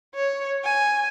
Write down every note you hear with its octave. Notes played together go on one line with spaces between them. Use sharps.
C#5
G#5